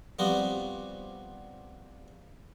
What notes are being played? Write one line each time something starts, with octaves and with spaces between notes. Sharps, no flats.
F3 G3 B3 C4 D4 F#4